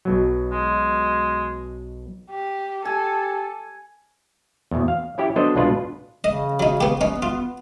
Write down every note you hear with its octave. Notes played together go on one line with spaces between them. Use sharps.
B1 B2 F#3
G#3
G4
G4 A4 G#5
E2 B2
F5
C#4 E4 G4
F#3 B3 D4 A4 C5 D#5
C2 B2 G#3 D4 F4 B4
C#3 D#5
F#3 D#4
B3 G4
B3 C#4 D#4
F4